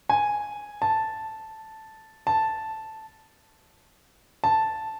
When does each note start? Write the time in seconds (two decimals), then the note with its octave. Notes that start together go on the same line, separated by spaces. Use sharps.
0.09 G#5
0.82 A5
2.27 A5
4.44 A5